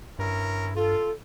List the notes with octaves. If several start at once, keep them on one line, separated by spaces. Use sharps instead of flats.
G2 C#4 E4 A#4
F4 A4